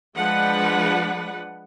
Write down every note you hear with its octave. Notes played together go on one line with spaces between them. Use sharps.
F3 G#3 D4 B4 F#5